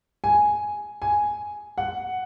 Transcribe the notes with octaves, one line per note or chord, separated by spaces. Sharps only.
G#5
G#5
F#5